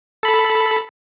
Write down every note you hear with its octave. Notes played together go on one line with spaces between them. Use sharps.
A4 B5